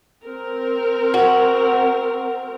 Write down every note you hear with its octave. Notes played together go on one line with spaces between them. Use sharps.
C4 A#4
F#4